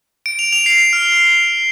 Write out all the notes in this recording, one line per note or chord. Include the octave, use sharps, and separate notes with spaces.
D7
F7
F7
C7
F6